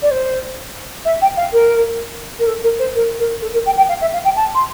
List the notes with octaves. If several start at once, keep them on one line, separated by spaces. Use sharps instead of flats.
D5
C5
E5
G5
F5
A#4
A#4
A4
A#4
C5
A#4
A#4
A4
A#4
G5
G5
F5
E5
F5
G5
A5
C6